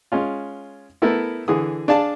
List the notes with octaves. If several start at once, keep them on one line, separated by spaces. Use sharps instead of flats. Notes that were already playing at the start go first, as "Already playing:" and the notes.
G#3 C#4 F4
A3 B3 E4 A4 A#4
D3 E3 G#4 D#6
D4 G#4 D5 F5 A5